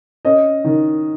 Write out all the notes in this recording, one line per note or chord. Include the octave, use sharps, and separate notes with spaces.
C#4 D#5
D#3